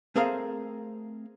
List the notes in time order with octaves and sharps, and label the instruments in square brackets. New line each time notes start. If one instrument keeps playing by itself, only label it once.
[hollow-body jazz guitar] A3 C4 G#4 A#4 C5 F5